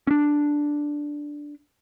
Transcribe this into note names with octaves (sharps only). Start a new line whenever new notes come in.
C#4 D4